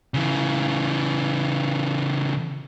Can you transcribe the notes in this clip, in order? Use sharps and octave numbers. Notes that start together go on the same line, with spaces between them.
C#3 E3